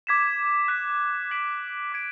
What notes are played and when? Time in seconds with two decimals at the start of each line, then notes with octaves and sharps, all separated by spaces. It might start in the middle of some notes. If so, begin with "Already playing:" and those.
0.07 D6 G#6 B6 E7
0.68 F#6 B6 E7
1.31 G#6 B6 D7 F#7
1.92 D6 G#6 D7